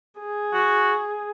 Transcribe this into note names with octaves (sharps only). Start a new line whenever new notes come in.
G#4
F#4